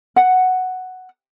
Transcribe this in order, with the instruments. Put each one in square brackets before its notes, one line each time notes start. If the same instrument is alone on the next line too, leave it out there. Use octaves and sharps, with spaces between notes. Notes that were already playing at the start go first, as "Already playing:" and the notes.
[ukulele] F#5